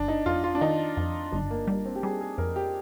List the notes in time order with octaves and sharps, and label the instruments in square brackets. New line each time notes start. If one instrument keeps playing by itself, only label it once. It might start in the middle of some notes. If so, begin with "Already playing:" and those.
Already playing: [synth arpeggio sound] G1 [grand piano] D4
[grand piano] D#4
[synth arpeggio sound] F2 [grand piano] F4
[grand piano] F4
D4
[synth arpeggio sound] D#3 [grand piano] D#4
[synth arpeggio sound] F2
[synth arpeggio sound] G1 [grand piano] D4
[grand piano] A#3
[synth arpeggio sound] G3 [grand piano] A#3
[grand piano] C4
G4
[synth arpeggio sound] G3 [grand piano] G#4
[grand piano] G#4
[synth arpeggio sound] F2 [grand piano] A#4
[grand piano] G4